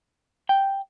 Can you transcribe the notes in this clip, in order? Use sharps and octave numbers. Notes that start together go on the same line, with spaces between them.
G5